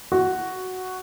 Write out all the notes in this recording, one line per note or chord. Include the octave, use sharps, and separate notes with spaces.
F#4